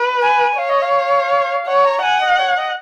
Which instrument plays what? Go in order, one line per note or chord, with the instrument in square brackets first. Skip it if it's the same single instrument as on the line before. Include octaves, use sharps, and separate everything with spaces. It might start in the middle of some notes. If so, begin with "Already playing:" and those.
Already playing: [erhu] B4
[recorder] G#5
[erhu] C#5 [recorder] F5
[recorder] D#5
F5
[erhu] C#5 [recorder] F#5
[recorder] A#5
[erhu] F#5 [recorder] G#5
[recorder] D#5
C#5
D#5